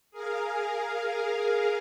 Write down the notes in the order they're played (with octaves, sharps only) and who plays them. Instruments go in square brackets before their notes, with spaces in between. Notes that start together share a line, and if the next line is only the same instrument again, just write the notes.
[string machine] G#4 A#4 F5